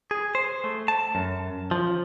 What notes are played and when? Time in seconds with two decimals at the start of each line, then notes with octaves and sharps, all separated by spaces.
0.11 G#4
0.35 C5
0.64 A3
0.88 A5
1.15 F#2
1.71 F3